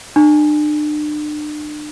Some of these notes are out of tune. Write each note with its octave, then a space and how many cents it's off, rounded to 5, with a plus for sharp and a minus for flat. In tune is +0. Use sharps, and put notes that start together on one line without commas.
D4 +40